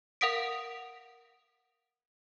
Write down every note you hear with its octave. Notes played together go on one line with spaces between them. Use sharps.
A#4 F5 F#5 D#6 B6 D7